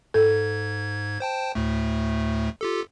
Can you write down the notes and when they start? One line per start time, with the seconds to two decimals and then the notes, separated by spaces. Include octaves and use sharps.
0.14 G#2 A4 G#6
1.20 C5 G5 A5
1.55 D2 A2 A3
2.61 F4 G4 A4